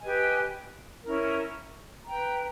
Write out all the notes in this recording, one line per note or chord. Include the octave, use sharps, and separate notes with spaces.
G4 B4 D#5 G#5
C#4 E4 A#4
B4 G5 A#5